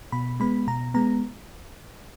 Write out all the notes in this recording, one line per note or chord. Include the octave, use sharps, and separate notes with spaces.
B2 B5
G#3 B3 B5
B2 A#5
G#3 B3 A#5